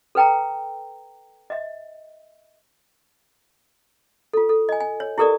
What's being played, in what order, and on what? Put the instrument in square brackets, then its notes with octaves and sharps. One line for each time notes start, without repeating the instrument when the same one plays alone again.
[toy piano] A4 B4 G5 A5 A#5
D#5 E5
F4 A4
A4
D#5 G#5
G#5
C#5
E4 G4 A4 A#4 D5 D#6